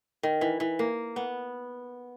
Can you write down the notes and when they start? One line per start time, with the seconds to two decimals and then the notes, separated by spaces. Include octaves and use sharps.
0.23 D#3
0.41 E3
0.60 E3
0.79 A#3
1.16 B3